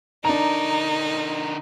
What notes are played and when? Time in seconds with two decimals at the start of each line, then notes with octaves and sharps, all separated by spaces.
0.25 D3 D4 D#4 A#4 A#5